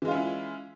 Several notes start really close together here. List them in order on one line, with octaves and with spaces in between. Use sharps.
E3 G#3 F4 C#4 E4